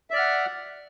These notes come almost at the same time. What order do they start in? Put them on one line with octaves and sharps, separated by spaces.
E5 D5 F6 F#5